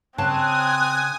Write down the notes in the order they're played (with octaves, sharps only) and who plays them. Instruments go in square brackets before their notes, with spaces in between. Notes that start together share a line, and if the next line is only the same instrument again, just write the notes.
[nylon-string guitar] C#3 C#5 A5 [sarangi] C4 [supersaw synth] G#5 D#6 [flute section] F#6